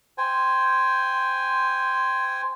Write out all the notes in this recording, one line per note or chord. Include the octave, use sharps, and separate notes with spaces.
C5 G5 G#5